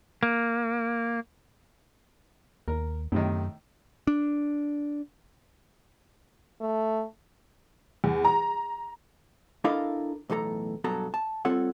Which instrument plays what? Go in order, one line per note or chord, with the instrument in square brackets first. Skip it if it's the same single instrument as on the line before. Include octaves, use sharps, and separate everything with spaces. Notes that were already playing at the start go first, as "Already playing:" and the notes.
[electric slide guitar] A#3
[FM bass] D#2 [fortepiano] A#4
[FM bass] F#2 [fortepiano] A2 C3 D#3
[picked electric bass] D4
[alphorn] A3
[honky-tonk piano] E2
A#5
[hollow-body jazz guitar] D4 E4 A4 A#4 D#5 F5
B1 E2 A2 A4 A#5
G2 B2 F#3 A4 A#5
A5
G3 C4 F4 A4 C#5 F#5